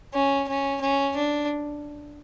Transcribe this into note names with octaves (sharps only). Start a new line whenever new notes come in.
C#4
C#4
C#4
D4